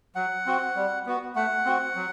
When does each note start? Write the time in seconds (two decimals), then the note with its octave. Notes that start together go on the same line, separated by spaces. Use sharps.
0.15 F#3 F#5
0.46 C4 F#4
0.75 G3
1.06 B3 F#4
1.36 A3 F#5
1.66 C4 F#4
1.95 F#3